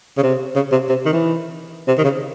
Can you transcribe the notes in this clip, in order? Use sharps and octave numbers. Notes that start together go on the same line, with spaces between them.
C#3
C3
C#3
C3
C3
D#3
E3
C3
D#3
C#3